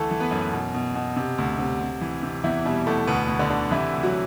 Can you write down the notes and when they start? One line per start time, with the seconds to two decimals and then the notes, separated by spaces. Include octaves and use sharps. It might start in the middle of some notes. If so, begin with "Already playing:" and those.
Already playing: D2 E3 A3 A4
0.11 E3
0.20 B3 B4
0.31 F#2
0.52 B2
0.74 B2
0.95 B2
1.16 C3
1.38 D2
1.58 C3
1.80 C3
2.01 E3
2.23 C3
2.44 E2 E3 E4
2.65 B2 G3
2.87 E2 A3
3.07 D2 B2 B3
3.29 D2
3.39 D3 D4
3.50 D3
3.71 C3 E3 E4
3.93 D2
4.03 F#3 F#4